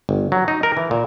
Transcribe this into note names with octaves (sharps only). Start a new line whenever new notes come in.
G1
F#3
D#4
A#4
E3
A#2